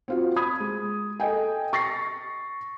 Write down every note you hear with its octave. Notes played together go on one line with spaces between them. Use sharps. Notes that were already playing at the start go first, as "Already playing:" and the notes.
C4 F4 F#4
B5 D#6 G#6
G#3
A4 D#5 G5 G#5
C#6 A6 A#6 C7